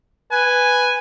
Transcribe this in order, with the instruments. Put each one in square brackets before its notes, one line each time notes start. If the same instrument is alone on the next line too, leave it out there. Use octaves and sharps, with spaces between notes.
[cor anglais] B4 [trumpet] G#5